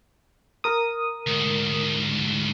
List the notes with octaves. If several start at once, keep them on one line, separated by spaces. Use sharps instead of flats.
A#4 D#6
D2 G#2